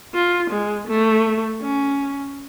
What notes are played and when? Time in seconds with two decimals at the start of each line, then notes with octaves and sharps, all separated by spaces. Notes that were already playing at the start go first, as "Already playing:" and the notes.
0.14 F4
0.51 G#3
0.88 A3
1.62 C#4